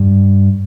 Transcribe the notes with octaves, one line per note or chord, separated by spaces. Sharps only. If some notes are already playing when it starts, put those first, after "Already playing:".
Already playing: G2